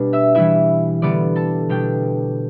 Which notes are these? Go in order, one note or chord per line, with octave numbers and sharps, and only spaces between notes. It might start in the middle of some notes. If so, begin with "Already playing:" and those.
Already playing: B2 G3 D4
E5 E6
E3 G3 E4 E5 E6
D3 G3 B3 D5 D6
A4 A5
B2 G3 D4 G4 G5